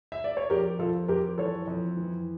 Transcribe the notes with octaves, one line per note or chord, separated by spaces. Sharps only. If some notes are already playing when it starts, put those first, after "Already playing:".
E5
D5
C#5
F2 G4 A#4
F2 F4 A4
F2 G4 A#4
E3 A4 C#5
F2
E3